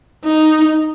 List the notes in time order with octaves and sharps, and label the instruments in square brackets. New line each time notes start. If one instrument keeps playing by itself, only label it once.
[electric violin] D#4